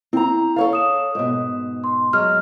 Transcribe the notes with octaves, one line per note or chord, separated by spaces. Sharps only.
C4 E4 A#5
A4 C#5 F5
D#6 E7
G#2 B2
C6
F#3 G#3 F6